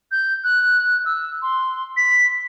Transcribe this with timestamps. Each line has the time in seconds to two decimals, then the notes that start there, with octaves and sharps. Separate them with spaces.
0.12 G6
0.44 F#6
1.06 E6
1.42 C6
1.97 B6